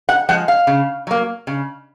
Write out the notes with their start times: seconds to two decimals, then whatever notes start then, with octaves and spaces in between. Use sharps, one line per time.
0.09 F#5
0.29 F3 G#3 F#5
0.48 F5
0.67 C#3
1.07 F#3 A#3
1.47 C#3